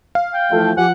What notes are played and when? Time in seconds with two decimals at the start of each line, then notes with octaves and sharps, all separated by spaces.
0.15 F5
0.34 G5
0.51 E3 F3 A3 F4 A4
0.77 F3 G4 F#5 G#5